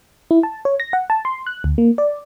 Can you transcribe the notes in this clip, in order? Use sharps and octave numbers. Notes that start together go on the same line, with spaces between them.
E4
A5
C#5
A#6
F#5
A5
C6
F#6
D2
A#3
D5